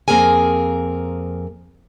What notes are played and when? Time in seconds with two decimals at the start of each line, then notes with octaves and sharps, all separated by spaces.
0.08 F2 A#3 C4 G#4 A#4 G#5